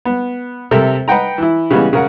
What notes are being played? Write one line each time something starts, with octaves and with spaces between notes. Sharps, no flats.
B3
C3 A4 A#4 E5
B4 D#5 F#5 G5 A#5
E3 E4
C#3 E3 G3 G#3 B3
C#3 A#4 F#5